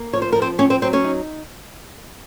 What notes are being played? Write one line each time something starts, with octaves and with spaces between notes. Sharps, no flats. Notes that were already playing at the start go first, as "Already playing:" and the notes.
Already playing: A#3
F3 C#5
C5
F3 A#4
C4 C5
C4 C#4 C#5
C4 C5
F#3 C4 C5
C#4 C#5
D#4